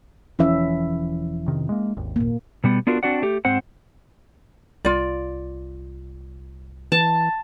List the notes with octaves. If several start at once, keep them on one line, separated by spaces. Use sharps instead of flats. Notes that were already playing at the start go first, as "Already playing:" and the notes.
E1 E3 F3 C#4 E4 E5
F2 C3 D#3
G#3 A#3
G#1 D#2
A#2 A#3
B2 G3 B3
B3 D4 F4 F#4 A#4
C4 D4 F#4 D5 F#5
A3 G4
G#2 C4 C5 F#5
C2 F4 D5
E3 A5